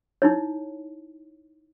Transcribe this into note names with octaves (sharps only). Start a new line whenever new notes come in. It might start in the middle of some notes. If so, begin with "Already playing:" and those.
D#4 E4 C#5